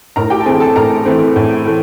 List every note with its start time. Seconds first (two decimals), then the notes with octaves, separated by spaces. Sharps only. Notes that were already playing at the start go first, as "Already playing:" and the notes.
0.16 A2 A#4 A#5
0.30 G4 G5
0.41 A5
0.46 E3 A3 C4 G#4 G#5
0.60 A4 A5
0.76 A2 A#4 A#5
1.05 E3 A3 C4
1.36 A2
1.66 E3 A3